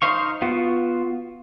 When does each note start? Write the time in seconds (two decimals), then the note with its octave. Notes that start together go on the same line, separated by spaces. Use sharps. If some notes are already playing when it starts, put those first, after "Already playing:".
0.02 D#4 C5 F5 C#6
0.42 B3 F4 F#4